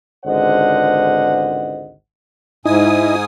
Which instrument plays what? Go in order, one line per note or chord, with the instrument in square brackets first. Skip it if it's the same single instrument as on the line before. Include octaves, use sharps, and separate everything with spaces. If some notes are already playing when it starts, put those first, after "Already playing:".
[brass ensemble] G#1 C#2 D3 C5 D#5 F#5
[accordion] G#2 G#5 D#6 [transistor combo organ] D#4 E4